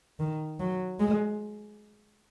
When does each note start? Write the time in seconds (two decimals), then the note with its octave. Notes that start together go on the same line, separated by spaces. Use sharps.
0.19 D#3
0.60 F#3
0.99 G#3